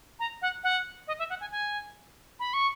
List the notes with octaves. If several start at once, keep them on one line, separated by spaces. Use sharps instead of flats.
A#5
F#5
F#5
D#5
E5
F#5
G#5
G#5
B5
C#6